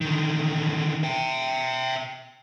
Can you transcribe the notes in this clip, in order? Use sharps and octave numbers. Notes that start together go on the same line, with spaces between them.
D3 D#3
E5 G5